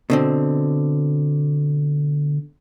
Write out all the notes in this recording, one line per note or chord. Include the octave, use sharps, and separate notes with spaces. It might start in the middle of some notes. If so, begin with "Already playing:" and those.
B2 D3 C4